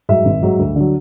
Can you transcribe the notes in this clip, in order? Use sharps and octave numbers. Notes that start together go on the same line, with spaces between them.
G#2 F#3 E5
G#1
G#2 F#3
D2
D3 F#3